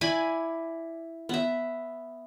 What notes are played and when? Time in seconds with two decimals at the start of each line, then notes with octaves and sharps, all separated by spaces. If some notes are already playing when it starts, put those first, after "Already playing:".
0.01 E4 D5 G#5 B5
1.29 B3 E5